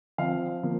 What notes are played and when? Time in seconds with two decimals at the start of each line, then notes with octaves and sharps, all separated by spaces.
0.18 F3 C4 F5
0.63 F3 A#3